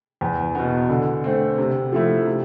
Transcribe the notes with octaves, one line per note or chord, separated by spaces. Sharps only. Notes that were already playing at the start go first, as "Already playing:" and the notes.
E2
B2 B3
D3
A3 C4
C3
F3 A3 E4
C3